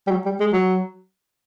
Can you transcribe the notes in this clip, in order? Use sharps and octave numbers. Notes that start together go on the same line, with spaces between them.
G3
F#3
G3
G#3
F#3